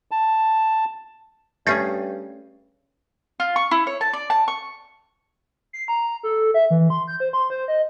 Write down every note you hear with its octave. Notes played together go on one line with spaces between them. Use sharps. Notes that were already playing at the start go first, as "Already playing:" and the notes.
A5
G2 A3 C#4 G#4 G6 A6 C7
F4
C#6
E4
C#5
A5
D5
A5
C#6
C7
A#5
A4
E5
E3
C6
G6
C5
C6
C5
D#5